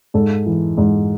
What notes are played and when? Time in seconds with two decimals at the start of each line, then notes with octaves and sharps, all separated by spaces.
0.14 G#2 A4
0.46 E3
0.77 G#2